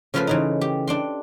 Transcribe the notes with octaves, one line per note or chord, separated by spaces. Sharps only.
C#3 F3 A3 F4 B4 C5
C#3 E3 D#4
G4
D4 G5 C6